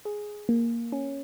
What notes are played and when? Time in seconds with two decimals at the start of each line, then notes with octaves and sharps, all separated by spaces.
0.05 G#4
0.49 A#3
0.92 C#4